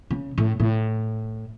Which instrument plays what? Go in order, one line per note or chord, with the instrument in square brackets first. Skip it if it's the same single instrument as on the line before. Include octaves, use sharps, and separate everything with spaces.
[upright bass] C#3
A2
A2